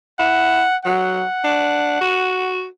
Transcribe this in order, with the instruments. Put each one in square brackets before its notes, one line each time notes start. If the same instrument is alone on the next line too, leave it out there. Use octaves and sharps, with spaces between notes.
[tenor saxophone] E4 [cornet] F#5
[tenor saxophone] F#3 [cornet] F#5
[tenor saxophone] D4
F#4